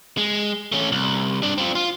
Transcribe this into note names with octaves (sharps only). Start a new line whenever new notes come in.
G#3
A3 C#4
C2
G2 D4
C4 F4
F4